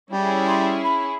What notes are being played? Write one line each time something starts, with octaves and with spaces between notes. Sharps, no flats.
G3 C#4 E4 G#4
C6
B5